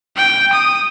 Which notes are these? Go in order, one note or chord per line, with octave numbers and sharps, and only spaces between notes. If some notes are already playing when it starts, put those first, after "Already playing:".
G5
D#6